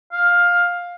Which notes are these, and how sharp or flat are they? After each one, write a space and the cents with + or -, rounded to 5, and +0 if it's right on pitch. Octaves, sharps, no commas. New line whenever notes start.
F5 +10